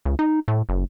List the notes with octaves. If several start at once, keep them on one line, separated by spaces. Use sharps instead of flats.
C#2
D#4
A2
F#1